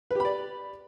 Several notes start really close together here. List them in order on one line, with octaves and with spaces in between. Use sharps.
B4 G4 B5 D5